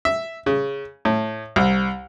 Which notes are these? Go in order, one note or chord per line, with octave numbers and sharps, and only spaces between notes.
E5
C#3
A2
C2